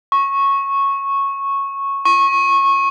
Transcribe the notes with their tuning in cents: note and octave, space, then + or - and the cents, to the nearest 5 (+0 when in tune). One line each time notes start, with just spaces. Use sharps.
C#6 -10
C#6 -20